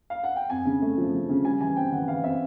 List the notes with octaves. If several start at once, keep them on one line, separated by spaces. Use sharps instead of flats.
F5
F#5
G5
F2 G#5
C#3
A3
F3
C#3
C#3
G3 G#5
E3 G#5
C4 G5
E3 F#5
E3 F5
C4 E5